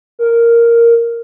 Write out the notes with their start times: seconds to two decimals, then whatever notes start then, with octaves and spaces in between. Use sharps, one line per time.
0.19 A#4